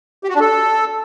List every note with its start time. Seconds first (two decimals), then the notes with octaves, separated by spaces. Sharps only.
0.24 G4
0.29 F#4
0.35 D4
0.40 A4